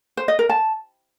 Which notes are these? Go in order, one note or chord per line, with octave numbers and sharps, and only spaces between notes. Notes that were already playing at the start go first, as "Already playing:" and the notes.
C5
D#5
A#4
A5